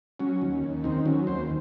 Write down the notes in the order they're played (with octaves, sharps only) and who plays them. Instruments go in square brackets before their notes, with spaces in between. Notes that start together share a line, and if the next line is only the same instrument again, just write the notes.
[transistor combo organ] F#3 C#4
D#2
D#2
D#3 C4
F#3 C#4
D#2 C5